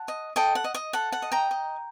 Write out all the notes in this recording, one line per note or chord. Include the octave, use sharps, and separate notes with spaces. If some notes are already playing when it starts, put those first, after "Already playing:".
Already playing: F#5 A5
D#5
A4 D#5 G5
F#5
D#5
D#5
A4 F#5
F#5
D#5
G5 A#5
D#5